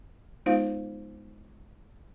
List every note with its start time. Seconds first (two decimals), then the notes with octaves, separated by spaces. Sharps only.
0.46 G#3 B3 D#4 F4 C5 F5